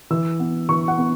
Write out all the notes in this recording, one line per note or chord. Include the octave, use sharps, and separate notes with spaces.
E3 E6
B3
E3 C#6
F#5
B3